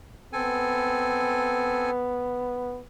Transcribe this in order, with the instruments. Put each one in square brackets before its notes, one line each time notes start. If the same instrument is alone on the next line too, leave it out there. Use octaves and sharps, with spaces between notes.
[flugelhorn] B3 [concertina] C4 A4 G#5